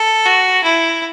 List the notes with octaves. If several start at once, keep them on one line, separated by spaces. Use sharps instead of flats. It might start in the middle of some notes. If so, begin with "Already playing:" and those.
Already playing: A4
F#4
E4